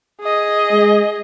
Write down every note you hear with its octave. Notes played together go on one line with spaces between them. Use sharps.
G#4 D#5
G#3